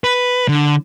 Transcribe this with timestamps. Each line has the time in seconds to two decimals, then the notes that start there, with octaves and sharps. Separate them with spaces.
0.04 B4
0.49 D3